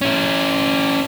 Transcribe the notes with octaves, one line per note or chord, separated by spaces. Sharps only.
C#4 E4